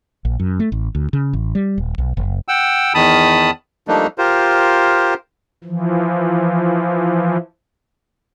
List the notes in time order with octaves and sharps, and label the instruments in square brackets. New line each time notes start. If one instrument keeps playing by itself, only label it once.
[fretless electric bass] A#1
F#2
A3
A1
D2
C#3
A1
G3
D#1
B1
F#1
[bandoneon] F#5 G5 E6
E2 D#3 A5 B5 D#6
F3 G3 A3 A#3 D4 D#4
F4 G4 A#4 C5
[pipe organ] E3 F3